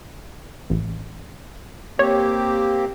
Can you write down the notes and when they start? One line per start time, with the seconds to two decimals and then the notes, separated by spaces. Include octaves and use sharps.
0.70 A1
1.99 A#3 C4 G4 C#5